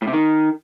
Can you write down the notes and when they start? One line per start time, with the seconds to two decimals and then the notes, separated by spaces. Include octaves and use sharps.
0.02 A2
0.07 C3
0.13 D#3